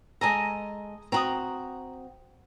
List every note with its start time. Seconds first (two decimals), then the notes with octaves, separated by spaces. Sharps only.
0.21 G#3 A4 D#5 G#5 A#5
1.12 C4 F#4 A#5 B5 D#6